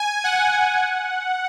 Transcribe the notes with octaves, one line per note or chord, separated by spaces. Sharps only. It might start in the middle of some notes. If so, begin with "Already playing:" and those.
Already playing: G#5
F#5
F#5